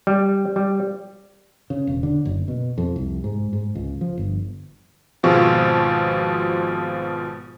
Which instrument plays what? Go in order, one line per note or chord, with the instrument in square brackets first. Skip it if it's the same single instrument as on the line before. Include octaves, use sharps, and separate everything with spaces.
[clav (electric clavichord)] G3
G3
[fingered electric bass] C#3
E1
D3
F#1
B2
F2
C2
G#2
G#2
C#2
F3
G1
[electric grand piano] G#1 B2 F3 F4 G#4 C#6